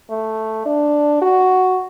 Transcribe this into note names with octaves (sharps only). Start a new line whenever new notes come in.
A3
D4
F#4